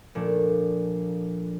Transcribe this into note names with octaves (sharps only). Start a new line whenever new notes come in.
A#2 F3 A3 D4